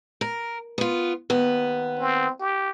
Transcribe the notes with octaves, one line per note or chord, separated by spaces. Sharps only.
A#4
B3 F4
D#2 B3
C4
G4